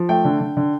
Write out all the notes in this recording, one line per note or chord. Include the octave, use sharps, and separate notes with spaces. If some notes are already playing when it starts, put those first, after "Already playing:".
Already playing: F3
A3 G5
D3
D3
D3